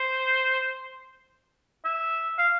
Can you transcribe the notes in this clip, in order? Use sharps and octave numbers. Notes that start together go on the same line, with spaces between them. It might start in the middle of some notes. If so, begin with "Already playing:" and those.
Already playing: C5
E5
F5